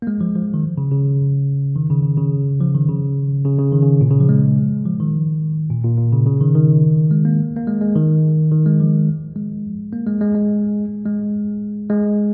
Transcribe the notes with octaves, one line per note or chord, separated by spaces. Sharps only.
A#3
G#3
F3
F3
D#3
C#3
C#3
D#3
C#3
C#3
C#3
F3
D#3
C#3
C#3
C#3
D#3
C#3
A#2
C#3
F3
G#3
F3
D#3
A#2
A#2
A#2
C#3
C#3
D#3
D#3
G#3
A#3
A#3
G#3
G#3
D#3
D#3
G#3
F3
G#3
A#3
G#3
G#3
G#3
G#3
G#3